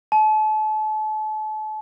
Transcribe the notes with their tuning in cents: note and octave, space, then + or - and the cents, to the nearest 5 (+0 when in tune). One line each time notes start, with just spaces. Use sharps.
A5 -35